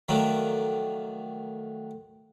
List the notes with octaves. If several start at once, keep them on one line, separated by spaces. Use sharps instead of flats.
D#3 F3 F#3 A3 D4